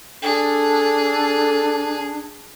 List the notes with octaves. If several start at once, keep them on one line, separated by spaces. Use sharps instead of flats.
D4 G#4 A4